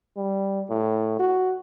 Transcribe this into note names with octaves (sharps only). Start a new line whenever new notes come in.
G3
A2
F#4